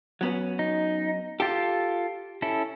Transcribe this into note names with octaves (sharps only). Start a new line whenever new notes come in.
F#3 B3 C#4
D#4
F4 G4 A4
C#4 E4 A4